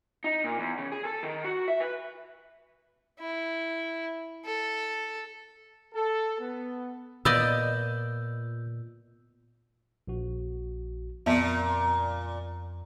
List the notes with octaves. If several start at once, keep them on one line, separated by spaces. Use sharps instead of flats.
D#4
A#2
E2
C#3
G#4
A4
D#3
F#4
E5
B4
E4
A4
A4
B3
A#2 B3 D5 D#5 E6 G6
A#1 F#4
F2 A#2 B3 E5